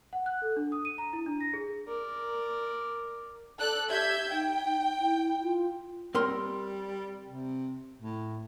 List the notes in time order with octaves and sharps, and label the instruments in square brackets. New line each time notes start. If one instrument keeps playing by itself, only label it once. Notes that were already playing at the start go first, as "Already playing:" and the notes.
[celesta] F#5
F#6
A4
D4
D#6
D#7
A#5
E4
D4
A#6
G#4
[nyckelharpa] A#4 D5
[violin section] A4 D5 F#6
[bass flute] G4 [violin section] E5 G6 G#6
[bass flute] D#4 [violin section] G5
[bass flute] E4
F4
[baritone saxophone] G3 [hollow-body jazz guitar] C4 A#4 C6
[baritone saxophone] C3
A2